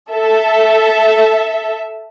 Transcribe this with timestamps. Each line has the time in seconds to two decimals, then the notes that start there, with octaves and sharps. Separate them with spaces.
0.12 A4 E5